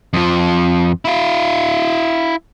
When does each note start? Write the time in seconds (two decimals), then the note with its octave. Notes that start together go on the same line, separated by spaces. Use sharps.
0.13 F2 F3
1.05 E4 F5